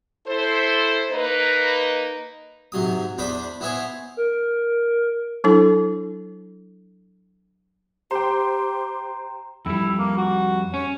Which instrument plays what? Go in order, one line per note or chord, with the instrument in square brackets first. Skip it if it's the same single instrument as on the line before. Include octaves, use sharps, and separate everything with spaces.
[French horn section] E4 A4 C5
A#3 D#4 B4
[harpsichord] G#2 C3 F#3 D#6
E2 D4 B4 C5 D5 D6
E3 B3 E4 G#4 C5 C#5
[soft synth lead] A#4
[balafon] F#3 D4 E4 A4
[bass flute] G4 [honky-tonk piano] C5 G5 [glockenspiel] A#5
[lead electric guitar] F2 G3 [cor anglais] E4
[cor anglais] A#3
F#4
[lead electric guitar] C#4 [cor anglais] C#5